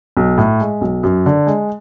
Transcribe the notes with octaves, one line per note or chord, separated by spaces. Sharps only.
B1
A2
G#3
B1
F#2
D3
G#3